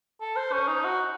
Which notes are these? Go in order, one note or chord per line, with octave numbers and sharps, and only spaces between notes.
A4
C5
C#4
D#4
F#4